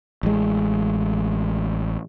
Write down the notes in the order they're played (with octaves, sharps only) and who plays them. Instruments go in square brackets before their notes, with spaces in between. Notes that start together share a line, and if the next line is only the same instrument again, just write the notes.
[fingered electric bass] A1 G#3